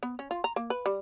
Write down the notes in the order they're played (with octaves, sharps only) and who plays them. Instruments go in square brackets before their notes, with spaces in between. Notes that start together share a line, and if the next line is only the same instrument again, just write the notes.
[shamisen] B3
C#4
F4
A#5
A#3
B4
G3